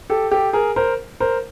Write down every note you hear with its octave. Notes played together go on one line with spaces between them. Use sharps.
G4 A4
G4 A4
G#4 A#4
A#4 C5
A#4 C5